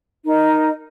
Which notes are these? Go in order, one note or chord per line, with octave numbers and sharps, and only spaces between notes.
D#4 A#4 D#5